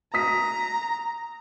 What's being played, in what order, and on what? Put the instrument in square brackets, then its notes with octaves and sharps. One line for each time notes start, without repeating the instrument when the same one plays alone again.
[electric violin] A#5 [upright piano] D#6 B6